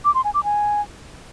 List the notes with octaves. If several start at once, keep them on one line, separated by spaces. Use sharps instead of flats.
D6
C6
G#5
D6
G#5